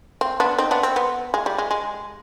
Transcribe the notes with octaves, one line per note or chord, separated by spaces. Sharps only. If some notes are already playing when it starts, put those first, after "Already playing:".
C4
B3 D4
C4 D#4
B3 D4
C4
B3
G#3
G3
G#3
G#3